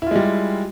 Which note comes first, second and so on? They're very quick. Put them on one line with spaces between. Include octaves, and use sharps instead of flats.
E4 F4 G#3 G3